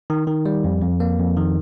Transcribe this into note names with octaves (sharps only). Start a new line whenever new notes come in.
D#3
D#3
G3
F2
F2
A#3
F2
D#3